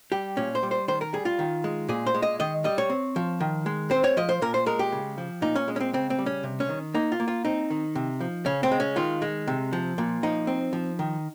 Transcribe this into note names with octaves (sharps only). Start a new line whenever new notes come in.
G3 G4
A#2 C#4
C5
G3
C5
D#3 C5
A#4
G3 G#4
F4
D#3
G#3
A#2 G#4
C5
G#3
D#5
D#3 D#5
G3 D#5
C#5
C4
F3
D#3
G#3
C4 C5
C#5
F3 D#5
C5
A#2 A#4
C5
G#3 A#4
G4
C#3
F3
A#2 D#4
C#4
G#3
C#4
C4
C#3 C4
C4
G3
C#4
C3
C#4
D#3
A#3 D#4
F4
A#3
F4
C4 D#4
D#3
C3
F3
C#3 C#4
C4
G#3
C#4
D#3 F4
G#3
C3
F3
A#2
F3 D#4
C4
F3
D#3